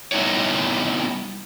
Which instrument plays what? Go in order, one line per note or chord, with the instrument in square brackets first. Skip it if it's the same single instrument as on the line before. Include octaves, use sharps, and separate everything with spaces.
[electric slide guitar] G3 B3 D#4 E4 C#5